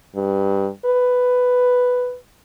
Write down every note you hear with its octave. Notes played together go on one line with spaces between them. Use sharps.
G2
B4